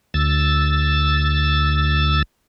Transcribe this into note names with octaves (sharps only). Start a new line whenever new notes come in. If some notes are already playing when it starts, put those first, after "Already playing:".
D2 E6 A6